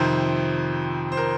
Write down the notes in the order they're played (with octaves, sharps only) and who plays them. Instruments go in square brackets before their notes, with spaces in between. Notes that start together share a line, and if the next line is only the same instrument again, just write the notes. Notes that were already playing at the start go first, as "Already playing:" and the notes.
Already playing: [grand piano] F2 C3 D#3 C5
C5
A#4